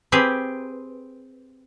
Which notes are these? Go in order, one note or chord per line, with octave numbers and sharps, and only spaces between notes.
C4 G4 G#4 B4